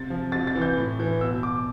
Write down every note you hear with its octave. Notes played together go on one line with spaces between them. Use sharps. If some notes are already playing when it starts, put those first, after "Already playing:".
Already playing: C3 A6
F3
C3 A6
A6
E3
G6
A2
E3
B2 E6
D6